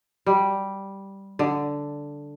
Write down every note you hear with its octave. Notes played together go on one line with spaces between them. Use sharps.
G3
D3